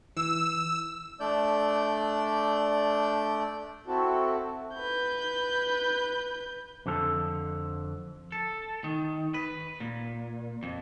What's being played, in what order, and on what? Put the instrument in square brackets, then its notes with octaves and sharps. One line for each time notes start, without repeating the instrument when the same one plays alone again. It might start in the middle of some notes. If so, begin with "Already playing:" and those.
[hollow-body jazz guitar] E3 [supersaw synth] E6
[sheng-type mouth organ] A3 D4 D5 G6
[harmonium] C4 E4 F#4 A4
[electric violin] B4 G6
[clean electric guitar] F2 D3 F3 A4
[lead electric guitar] A4
D#3
B4
A#2
F2